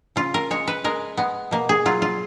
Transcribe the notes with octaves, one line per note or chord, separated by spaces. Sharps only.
C#3 F4
A#4
G#3 C#5
B4
G#3 A#4
G#3 B3
B2 A#3
G#4
F#3 F4
F4